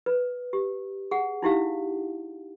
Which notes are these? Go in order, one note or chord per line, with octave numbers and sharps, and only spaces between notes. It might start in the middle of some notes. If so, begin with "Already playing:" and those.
B4
G4
G#4 F#5
D#4 E4 G4 F5